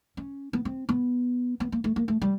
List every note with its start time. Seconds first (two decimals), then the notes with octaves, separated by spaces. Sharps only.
0.17 C#4
0.53 B3
0.65 C4
0.89 B3
1.60 B3
1.72 A#3
1.84 A3
1.96 A#3
2.08 A3
2.22 G3